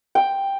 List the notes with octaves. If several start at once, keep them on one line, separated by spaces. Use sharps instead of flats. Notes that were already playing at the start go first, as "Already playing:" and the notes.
G5